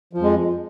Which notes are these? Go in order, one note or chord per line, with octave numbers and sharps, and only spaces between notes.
F2 F3 G#3